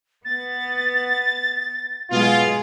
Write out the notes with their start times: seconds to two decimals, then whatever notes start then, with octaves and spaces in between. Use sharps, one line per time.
0.25 B3 A6
2.11 B2 G#3 F4 G#4